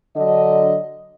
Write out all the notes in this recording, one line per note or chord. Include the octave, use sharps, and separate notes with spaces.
D3 F#3 D4 D#5